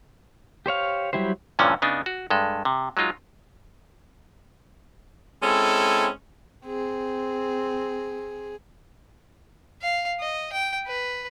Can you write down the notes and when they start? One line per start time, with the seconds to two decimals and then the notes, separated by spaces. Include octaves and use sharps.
0.66 G4 C5 C#5 F5
1.13 F#3 G3 E4 G4 C5
1.59 G2 A#2 D3 E3 F3 C#4
1.82 C#3 B3 D4 D#4
2.06 F#4
2.30 G2 G#3 A4
2.65 C3
2.97 F#3 G#3 D#4 F4
5.42 G#3 C4 C#4 E4 A4
6.66 C4 G#4
9.82 F5
10.20 D#5
10.52 G5
10.87 B4